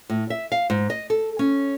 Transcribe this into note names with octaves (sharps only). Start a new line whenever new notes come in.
A2
E5
F5
G#2
D#5
A4
C#4